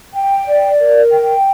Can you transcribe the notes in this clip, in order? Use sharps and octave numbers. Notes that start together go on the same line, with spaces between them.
G5
D5
A#4
G5